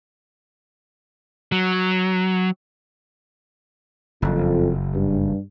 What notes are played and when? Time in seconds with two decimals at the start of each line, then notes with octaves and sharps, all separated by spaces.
1.52 F#3
4.22 F#1 F2
4.93 G2